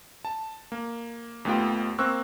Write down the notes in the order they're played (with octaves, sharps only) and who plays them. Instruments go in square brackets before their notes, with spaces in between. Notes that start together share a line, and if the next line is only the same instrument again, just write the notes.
[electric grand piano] A5
A#3
D#2 A3 B3 F4 G5
A#3 C4 C#6 E6 F#6